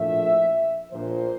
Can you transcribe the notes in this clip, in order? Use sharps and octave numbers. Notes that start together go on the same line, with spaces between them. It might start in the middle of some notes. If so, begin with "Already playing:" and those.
Already playing: A#1 A2 F3 A3 E5
A#1 A#2 F3 C5